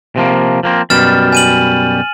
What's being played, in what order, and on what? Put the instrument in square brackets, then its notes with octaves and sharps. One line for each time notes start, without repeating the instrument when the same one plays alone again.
[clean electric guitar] C3 F3 A#3
F3 A#3 C4
[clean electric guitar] F#2 B2 G3 [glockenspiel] F6 A6 E7
[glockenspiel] G#5 D#7 F#7